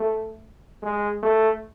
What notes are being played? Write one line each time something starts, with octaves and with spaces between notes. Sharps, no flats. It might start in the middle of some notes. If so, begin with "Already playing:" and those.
Already playing: A3
G#3
A3